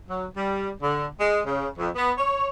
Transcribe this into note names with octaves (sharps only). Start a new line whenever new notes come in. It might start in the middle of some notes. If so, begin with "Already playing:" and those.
F#3
G3
D3
G#3
C#3
F2
B3
C#5